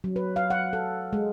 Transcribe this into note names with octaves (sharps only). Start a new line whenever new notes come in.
F#3
B4
F5
F#5
A4
G#3